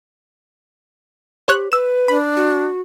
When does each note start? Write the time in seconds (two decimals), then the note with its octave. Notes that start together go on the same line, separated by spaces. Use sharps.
1.48 G4 C5 C#5 F#6
1.72 B4 E6 E7
2.08 D4 B5
2.36 F#4